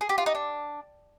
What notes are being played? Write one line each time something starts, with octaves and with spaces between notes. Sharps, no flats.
G#4
G4
F4
D#4
D4